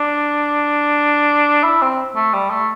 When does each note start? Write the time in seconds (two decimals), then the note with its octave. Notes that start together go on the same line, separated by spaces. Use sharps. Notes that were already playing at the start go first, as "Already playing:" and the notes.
Already playing: D4
1.64 E4
1.82 C4
2.16 A3
2.33 G3
2.50 A3